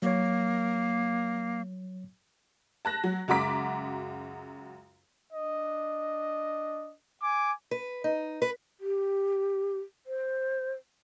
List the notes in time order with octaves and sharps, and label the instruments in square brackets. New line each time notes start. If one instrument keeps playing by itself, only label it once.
[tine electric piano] F#3 C#5 [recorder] A#3
[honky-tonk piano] A5 F#6 A#6
F#3
C#2 F#2 F#4 A#5 D6 B6
[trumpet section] D4 D#5
G#5 D6
[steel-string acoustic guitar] B4
D#4
B4
[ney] G4
C5